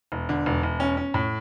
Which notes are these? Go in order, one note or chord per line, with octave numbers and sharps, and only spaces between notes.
E1
D3
E1
E1
C#4
C#4
A2